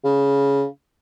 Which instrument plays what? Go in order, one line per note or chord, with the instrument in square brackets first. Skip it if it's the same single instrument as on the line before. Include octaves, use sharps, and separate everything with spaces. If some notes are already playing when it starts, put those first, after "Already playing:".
[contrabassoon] C#3